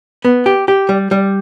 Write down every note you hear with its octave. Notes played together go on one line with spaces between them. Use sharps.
B3
G4
G4
G3
G3